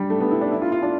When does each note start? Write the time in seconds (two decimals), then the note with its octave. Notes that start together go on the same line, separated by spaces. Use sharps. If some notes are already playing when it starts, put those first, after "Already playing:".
Already playing: G3 D4
0.10 A3
0.20 B3
0.31 E4
0.41 D4
0.52 E4
0.62 F4
0.72 F4
0.82 D4